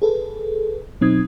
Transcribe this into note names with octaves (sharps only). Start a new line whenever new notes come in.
G#4 A4 B4
B2 F#3 C4 D#4 D#6 G#6